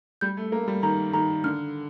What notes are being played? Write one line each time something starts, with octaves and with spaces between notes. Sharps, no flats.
G3 G6
A3
A#3 A#5
G3
D#3 A#5
D#3 A#5
D3 F6